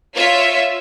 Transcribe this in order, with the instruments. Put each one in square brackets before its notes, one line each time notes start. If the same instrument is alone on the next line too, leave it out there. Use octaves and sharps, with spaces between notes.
[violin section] F4 C#5 E5 F5